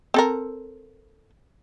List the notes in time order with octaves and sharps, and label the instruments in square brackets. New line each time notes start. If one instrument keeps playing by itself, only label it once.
[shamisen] C4 A4 A#4